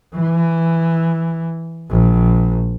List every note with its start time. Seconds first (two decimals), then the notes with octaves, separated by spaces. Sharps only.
0.14 E3
1.90 A#1